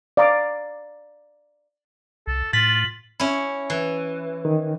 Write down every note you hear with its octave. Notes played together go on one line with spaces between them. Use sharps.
D5 F5 A#5 D6 D#6
C2 A4
A2 F4 A6 B6 F#7
C#4 E4
E3
D#3